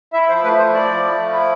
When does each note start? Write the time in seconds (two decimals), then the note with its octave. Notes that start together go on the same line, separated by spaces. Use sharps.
0.13 E4 E5
0.29 F3 C5
0.43 A3 B4
0.58 F3 C5
0.74 E4 D5
0.88 F3
1.03 A3
1.18 F3
1.33 E4